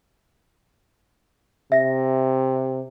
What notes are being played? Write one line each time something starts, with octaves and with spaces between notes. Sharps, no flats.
C3 E5 A#6